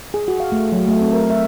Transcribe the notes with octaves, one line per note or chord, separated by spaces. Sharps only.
G#4
F#4
F5
A3
F#3
A3
C4
A#4
E5